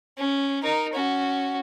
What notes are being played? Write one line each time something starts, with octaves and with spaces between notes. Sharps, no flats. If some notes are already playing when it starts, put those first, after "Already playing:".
C#4
D#4 A#4
C#4 F#4